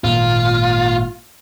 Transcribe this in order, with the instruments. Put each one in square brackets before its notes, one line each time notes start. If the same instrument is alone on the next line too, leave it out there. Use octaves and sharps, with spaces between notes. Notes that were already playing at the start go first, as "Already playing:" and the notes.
[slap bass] G#1 A#2 A#3 [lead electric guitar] F4